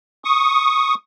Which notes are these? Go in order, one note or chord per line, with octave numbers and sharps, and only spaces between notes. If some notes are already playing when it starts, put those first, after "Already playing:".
C#6 D#6